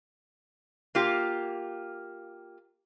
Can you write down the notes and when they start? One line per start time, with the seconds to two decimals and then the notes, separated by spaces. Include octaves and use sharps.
0.95 A#3 F4 G4